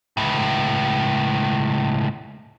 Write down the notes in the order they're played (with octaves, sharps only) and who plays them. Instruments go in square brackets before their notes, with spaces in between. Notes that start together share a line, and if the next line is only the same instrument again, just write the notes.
[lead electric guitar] C#2 A2